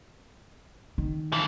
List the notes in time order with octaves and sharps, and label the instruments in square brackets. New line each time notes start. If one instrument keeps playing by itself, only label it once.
[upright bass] D#3
[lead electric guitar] E3 F3